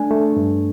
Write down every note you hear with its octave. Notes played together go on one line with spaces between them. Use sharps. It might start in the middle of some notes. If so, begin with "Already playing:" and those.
Already playing: A3 D4 G#5
A3
G2